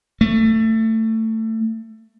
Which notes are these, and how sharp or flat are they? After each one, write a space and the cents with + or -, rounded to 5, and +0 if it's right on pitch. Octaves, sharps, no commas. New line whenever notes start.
A3 +20